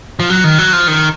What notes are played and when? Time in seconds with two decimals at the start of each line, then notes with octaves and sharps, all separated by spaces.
0.20 F3
0.30 F#3
0.44 D#3
0.59 F#3
0.73 F3
0.88 D#3